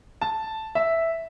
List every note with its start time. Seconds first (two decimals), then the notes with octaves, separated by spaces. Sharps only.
0.21 A5
0.75 E5